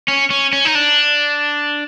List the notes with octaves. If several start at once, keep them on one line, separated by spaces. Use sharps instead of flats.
C#4
C#4
C#4
D#4
D4